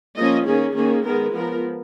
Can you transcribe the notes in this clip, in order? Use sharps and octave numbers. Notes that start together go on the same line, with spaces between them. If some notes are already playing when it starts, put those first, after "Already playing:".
F3 A#3 C#4 D#5
D#3 A#3 C#4 G#4
D#3 A#3 C#4 G#4
D#3 G#3 B3 A#4
F3 B3 A#4